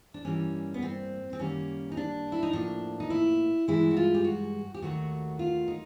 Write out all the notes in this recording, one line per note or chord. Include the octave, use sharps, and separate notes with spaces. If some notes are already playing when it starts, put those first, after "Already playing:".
D4
G2 E3 G3 A#3 C#4
B3
C4
C4
F#2 D#3 G3 A#3 C#4
D#4
D4
E4
D#4
A2 F3 A#3 D4
D#4
E4
G2 E3 G#3 E4
F#4
F4
G4
F#4
G4
D#2 D#3 F#3 A3 F#4
F4
D#4